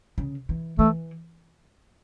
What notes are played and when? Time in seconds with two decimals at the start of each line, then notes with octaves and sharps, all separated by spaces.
0.18 C#3
0.49 E3
0.79 E3 A3